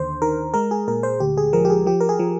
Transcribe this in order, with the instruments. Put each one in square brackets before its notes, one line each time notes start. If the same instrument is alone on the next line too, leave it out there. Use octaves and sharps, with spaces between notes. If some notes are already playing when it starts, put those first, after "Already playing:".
Already playing: [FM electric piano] D#2 D3 C5
D#3 A#4
G#3 A#4
G#4
A#2 A#4
C5
D2 G4
G#4
F3 A#4
G4
G#4
F3 G4
A#4
G#4
F3